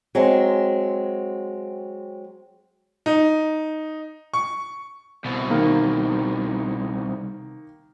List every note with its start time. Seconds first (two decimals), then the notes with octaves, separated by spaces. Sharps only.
0.15 F#3 G#3 C4
3.06 D#4
4.34 C#6
5.25 C2 B2
5.50 D#3 A#3